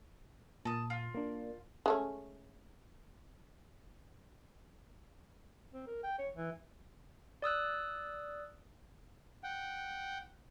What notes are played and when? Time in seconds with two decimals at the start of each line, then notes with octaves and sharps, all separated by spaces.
0.65 A#2 A5 D#6
0.90 F4
1.14 A#3 D4
1.86 G#3 A3 C#4
5.73 C4
5.87 A#4
6.04 G5
6.19 C#5
6.35 E3
7.42 D5 D#6 E6 F#6
9.44 F#5 G5